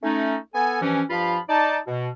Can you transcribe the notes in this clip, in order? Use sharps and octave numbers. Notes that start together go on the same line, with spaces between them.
A3 C#4 D#4
B3 A4 G#5
G2 E3 F3 C#4
G2 F3 F4 F5 B5
D#4 D5 A5
B2